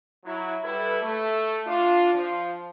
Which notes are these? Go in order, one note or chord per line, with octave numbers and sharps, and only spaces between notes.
F#3 E4
G3 E4 A4 B4
A3
D4 F4
F3